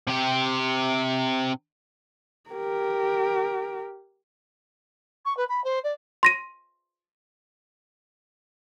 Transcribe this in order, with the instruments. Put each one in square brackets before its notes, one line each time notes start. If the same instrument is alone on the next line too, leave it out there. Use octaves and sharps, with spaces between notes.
[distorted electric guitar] C3 G4
[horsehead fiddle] G4 A#4
[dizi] C#6
B4
B5
C5
D5
[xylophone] C6 A#6 D#7